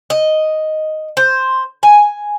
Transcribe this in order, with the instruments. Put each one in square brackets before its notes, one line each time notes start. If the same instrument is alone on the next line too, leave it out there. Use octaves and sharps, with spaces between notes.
[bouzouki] D#5
C5
G#5